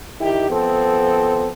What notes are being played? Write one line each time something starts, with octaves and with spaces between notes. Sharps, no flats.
D#3 E4 G4
F3 B3 C4 A4